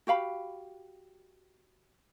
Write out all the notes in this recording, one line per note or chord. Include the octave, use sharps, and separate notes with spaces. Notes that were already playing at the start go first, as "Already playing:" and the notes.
F#4 G4 F5 B5